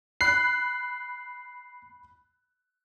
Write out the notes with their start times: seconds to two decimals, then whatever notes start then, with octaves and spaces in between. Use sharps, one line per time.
0.21 B5 F#6 C7